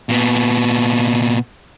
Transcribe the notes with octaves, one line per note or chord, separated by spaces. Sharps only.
A#2 B3